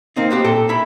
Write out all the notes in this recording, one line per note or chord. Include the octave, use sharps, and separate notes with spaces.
A#3 C4 D#4
B3 C4 G4
A#2 A4 G5
E4 B5